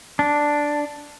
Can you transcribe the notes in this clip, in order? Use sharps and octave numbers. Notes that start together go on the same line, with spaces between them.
D4